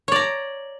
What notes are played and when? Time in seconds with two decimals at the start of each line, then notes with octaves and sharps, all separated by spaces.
0.08 C#5
0.12 D5
0.16 A#5